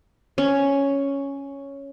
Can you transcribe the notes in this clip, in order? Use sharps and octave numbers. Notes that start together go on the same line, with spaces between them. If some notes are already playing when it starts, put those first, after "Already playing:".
C#4